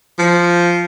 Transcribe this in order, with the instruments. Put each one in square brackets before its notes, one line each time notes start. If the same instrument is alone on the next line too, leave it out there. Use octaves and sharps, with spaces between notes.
[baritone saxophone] F3